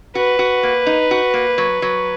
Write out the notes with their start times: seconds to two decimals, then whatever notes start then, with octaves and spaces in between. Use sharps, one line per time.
0.15 F#4 B4
0.39 F#4
0.63 A#3
0.87 D#4
1.11 F#4
1.34 A#3
1.58 F#3
1.82 F#3